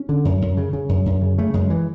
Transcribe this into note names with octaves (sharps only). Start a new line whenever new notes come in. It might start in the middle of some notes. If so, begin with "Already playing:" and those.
Already playing: C#4
D3
F#2
F#2
C#3
C#3
F#2
F#2
C#3
C#3 A3
F#2 G#3
E3